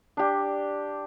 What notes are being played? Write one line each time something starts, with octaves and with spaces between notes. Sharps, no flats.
D4 G4